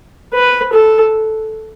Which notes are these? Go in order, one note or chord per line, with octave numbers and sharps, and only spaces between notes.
B4
A4